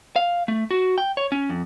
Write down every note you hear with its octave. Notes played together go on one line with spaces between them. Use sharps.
F5
A3
F#4
G5
C#5
C#4
F2